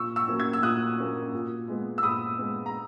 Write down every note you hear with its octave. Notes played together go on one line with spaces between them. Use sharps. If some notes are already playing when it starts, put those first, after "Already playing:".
Already playing: A#2 C#6 E6
C#6 E6
F#3 A#3 C#4
E6 G#6
E6
A#2 D#6 F#6
F#3 A#3 C#4
A#2
G#3 B3
E6
A#2 B5 D#6
G#3 B3
A#5